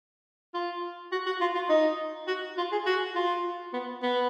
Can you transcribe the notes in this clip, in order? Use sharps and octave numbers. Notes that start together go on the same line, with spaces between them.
F4
F#4
F#4
F4
F4
D#4
F#4
F4
G#4
F#4
F4
B3
B3